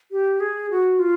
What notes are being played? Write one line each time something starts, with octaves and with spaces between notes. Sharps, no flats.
G4
G#4
F#4
F4